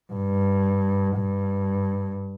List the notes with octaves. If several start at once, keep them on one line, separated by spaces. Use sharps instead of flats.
G2
G2